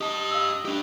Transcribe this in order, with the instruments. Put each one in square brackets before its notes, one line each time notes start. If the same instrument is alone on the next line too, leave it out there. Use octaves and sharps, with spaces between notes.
[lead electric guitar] G4 A5 [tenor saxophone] D#5
[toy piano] F5 E6
[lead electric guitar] D4 G4